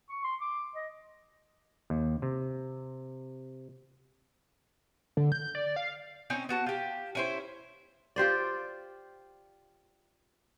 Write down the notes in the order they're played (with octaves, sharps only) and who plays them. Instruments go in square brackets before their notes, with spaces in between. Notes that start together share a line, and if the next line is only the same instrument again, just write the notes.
[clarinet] C#6
C6
D6
D#5
[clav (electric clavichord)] D#2
C3
[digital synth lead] D3
G6
D5
F5
[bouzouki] C4 C#4 D#4
B3 F#4 A5
F4 G4
C#4 E4 C5
[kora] F4 G4 C5 D5